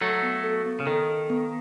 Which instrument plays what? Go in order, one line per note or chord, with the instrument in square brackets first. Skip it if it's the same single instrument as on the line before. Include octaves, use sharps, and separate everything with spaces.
[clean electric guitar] F#3 A3 [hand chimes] A4
[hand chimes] B3
A4
B3
[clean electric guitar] C#3
[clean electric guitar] D#3 [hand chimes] A4
[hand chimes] A4
B3